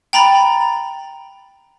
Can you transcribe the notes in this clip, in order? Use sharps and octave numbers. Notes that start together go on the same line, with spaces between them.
G5 A#5 B5 A6